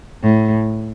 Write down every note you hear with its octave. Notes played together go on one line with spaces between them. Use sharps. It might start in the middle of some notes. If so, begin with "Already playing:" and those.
A2